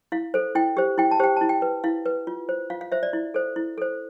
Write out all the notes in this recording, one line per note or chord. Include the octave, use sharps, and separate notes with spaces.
E4 F5
A4 C5
E4 G5
G4 C5
E4 G5
A5
G4 C5 G5
E4 A5
G5
B4
E4 F5
B4
F4
C5
F4 F5
F5
C5 E5
D5
E4
A4 C5
E4
A4 C5